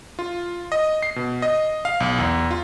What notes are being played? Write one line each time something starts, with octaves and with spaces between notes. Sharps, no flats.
F4
D#5
C7
B2
D#5
F5
B1
E2
F4